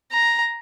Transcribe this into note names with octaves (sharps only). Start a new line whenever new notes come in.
A#5